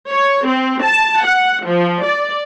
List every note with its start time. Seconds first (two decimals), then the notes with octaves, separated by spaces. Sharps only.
0.11 C#5
0.47 C4
0.84 A5
1.25 F#5
1.68 F3
2.05 D5